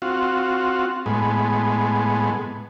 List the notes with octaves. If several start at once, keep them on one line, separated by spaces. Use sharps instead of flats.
C4 F4 F#4
A2 G#3 B3